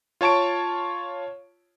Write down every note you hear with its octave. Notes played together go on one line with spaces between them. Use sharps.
F4 C#5 A5 C#6 D7